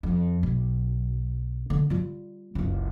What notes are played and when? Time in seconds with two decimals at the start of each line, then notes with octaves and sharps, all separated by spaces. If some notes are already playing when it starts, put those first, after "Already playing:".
0.03 F2
0.43 B1
1.70 D3
1.90 G3 F4
2.55 F#1 C#2